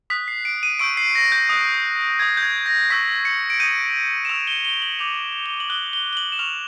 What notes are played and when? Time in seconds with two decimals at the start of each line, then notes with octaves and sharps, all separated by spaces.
0.10 D#6 F#6 B6
0.28 C7
0.45 D7
0.63 D#7
0.79 C#6 E6 G6 D7
0.97 C7
1.15 A#6
1.32 G6
1.49 D#6 F#6
2.19 D#6 G6 G#6
2.37 G6
2.43 G#6
2.66 A#6
2.90 C#6 E6 G6 B6
3.25 C#7
3.50 D7
3.60 D#6 G6 D#7
4.25 E7
4.29 C#6 E6 G6 F7
4.47 G7
4.65 G7
4.82 F#7
4.99 D6 G6 F7
5.46 G7
5.60 F#7
5.69 D#6 F#6 G7
5.93 G7
6.13 G7
6.17 F#7
6.32 E7
6.39 C#6 F6 F7